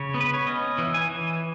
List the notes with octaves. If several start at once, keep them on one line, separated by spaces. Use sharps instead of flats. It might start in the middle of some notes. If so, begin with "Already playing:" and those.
Already playing: C#3 C#5
B3
B4
C#5
C#4 D#5
E3
G#5
E3